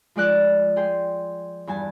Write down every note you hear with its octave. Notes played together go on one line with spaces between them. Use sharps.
F3 G#3 D5 F#6
G#4 G5 C6
E2 G2 G#5 A5